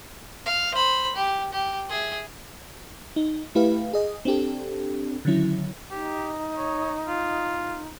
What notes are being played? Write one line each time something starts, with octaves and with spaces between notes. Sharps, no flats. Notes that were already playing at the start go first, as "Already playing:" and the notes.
F5
C5 B5
G4
G4
G#4 E5
D#4
A3 E4 G4 B4 F5
G#4 D#5
C4 D4 G4 A4
D3 D#3 F#3 C#4 E4
D#4 G4
C#5
F4